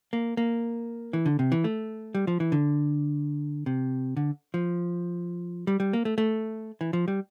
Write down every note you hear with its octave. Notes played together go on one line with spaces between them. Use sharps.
A#3
A#3
E3
D3
C3
E3
A3
G3
F3
E3
D3
C3
D3
F3
G3
G3
A#3
A3
A3
E3
F3
G3